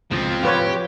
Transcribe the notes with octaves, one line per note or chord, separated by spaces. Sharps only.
C#2 G2 B2 F3 C4
F2 A2 C3 F4 G4 B4 C#5